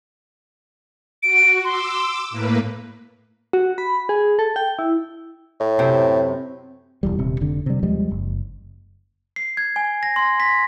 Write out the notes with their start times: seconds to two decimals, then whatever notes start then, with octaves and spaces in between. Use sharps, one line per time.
1.23 F#4 D7
1.65 C6 D6 E6
2.30 A2 A#3 B4
3.53 F#4
3.78 B5
4.09 G#4
4.39 A4
4.56 G5
4.79 E4
5.60 A2
5.79 F#2 C3 C4
7.03 E1 E2 G3
7.19 D#1 C3
7.41 F1 D3
7.66 C3 G3
7.82 D#2 F3 G3 G#3
8.11 F#1
9.36 C7
9.57 G#6
9.76 G#5
10.03 A#6
10.16 C6
10.40 B6